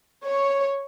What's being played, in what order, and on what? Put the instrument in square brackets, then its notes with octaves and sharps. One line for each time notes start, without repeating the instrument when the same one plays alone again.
[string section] C#5